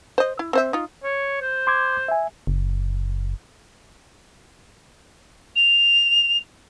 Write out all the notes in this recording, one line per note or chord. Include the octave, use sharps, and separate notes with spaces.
C5 D#5
E4
C4 C5 E5
D#4 F4
C#5
C5
C6 D6 G#6
E5 G#5
F#1
F7